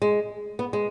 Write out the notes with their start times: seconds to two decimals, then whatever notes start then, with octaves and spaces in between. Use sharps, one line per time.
0.02 G#3
0.59 B3
0.73 G#3